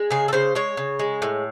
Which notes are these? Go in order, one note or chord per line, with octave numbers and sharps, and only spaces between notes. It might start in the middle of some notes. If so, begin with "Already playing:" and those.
Already playing: G#3
C#3 G#4
A4
C#3 C5
G#3 C#5
C#3
G#3
A2